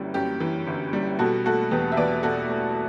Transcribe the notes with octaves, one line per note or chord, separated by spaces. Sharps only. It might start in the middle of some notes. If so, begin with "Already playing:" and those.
Already playing: G1 F#2 E3 G3
F#2 G4
E3
G1
G3
B2 F#4 A4
A3 F#4 A4
E2 G4 B4
E5
E2 B4 D5
B2 F#4 A4
A3